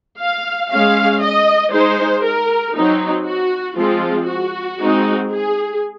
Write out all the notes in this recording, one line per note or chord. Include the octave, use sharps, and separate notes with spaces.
F5
G#3 C#4 F5
D#5
G#3 D#4 C5
A#4
F#3 C4 D#4
F#4
F3 G#3 C4 F4
F#4
G#3 C4 D#4
G#4